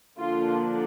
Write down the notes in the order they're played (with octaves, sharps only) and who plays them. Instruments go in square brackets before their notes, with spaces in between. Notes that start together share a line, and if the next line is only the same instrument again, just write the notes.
[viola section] D3 F3 A#3 D4 F4